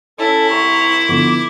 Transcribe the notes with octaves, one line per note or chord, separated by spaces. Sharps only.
C#4 E4 A4
C2 A#5 C6 C#6
D3 F3 B3 D6